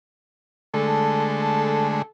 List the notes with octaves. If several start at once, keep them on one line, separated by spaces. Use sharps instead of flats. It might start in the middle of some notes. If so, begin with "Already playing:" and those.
D3 G#3 A3 A4